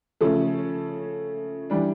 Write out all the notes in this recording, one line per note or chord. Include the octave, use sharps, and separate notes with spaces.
C#3 F3 A3 C#4 A4
E3 G3 D4